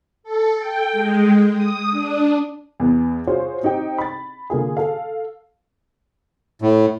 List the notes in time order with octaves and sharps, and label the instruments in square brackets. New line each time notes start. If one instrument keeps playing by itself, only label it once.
[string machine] A4
G5
G#3
D#6
D4
[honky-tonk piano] E2 B3
F4 F#4 G#4 C5 C#5
C4 D#4 G4 G5
B5 A6
D3 A#3 F4 G#4
A4 F5
[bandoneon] A2